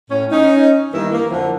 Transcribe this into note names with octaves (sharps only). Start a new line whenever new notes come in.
A2 C#4
C#4 D#4
G2 D#3 E3 A#3 B3 E4
A#3
F2 D3 E3 F3